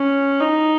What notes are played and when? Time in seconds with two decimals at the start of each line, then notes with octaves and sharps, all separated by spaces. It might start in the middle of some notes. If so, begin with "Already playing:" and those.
Already playing: C#4
0.40 D#4